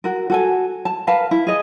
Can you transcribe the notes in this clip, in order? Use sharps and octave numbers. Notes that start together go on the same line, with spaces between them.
F#4 A#4
F#4 A4 G#5
A5
A#4 B4 F5 A5
E4
G#4 D#5